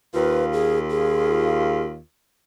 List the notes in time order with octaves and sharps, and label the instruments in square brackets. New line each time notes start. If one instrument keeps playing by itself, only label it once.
[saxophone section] D#2 F4 [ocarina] B4
[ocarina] G#4
G#4